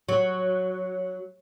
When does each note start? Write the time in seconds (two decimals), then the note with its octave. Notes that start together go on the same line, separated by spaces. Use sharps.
0.09 F#3